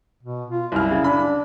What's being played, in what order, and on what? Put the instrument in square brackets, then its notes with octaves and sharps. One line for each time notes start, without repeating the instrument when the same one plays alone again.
[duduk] B2
F4
[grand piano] C2 F#2 F6 [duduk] E4
[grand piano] C#3
[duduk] D4 [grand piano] B5